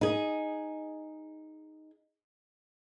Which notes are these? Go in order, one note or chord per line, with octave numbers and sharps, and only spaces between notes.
D#4 G#4